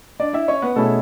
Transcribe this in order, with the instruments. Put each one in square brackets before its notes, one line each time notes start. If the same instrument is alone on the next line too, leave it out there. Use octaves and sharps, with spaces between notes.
[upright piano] D4 D5
E4 E5
C#4 C#5
B3 B4
[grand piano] B2 A3 C#4 E4 G#4 [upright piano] A4